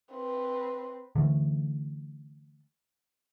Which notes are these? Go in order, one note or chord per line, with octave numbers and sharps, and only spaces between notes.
C4 B4
D3 E3 A3